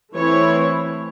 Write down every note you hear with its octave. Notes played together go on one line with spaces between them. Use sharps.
E3 A3 C4 E4 C#5